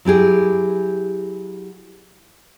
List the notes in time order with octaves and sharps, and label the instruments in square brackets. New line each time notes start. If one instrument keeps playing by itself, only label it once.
[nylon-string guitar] F#3 E4 G4 G#4